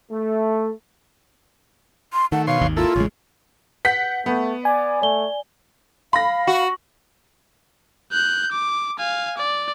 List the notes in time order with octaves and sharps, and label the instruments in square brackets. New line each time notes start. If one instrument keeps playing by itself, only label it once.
[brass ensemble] A3
[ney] C6
[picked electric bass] D#3 [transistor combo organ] A3 [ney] F#5
[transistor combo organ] B2 C#5 C6 [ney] F5
[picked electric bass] G#1 D#2 D#3
[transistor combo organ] A#3 E4 A4 [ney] F4
[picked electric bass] A1 G#3 [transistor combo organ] C#3
[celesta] B4 [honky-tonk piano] F#5 B6 [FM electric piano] G6
[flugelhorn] A3 [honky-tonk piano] B3
[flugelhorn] D5 [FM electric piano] G#5
[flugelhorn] A3 [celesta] D5 G7
[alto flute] F5 [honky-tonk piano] B5 A#6
[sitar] F#4
[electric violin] F#6 G6
D6
F5 G#5
D5